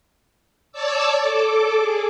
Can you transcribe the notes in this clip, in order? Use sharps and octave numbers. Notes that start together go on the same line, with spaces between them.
C#5 D5 A5 D6 E6
A4 D6
G#4